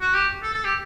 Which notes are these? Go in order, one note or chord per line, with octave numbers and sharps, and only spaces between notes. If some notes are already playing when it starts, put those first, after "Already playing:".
F#4
G4
A4
A4
G4